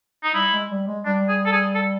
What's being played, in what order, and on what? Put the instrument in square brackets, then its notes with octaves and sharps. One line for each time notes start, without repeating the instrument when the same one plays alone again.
[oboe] D#4
[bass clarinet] G3 [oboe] E4
[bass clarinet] G#3
G3
G#3
[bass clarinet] G3 [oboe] D4
[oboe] G#4
A4
G#4
A4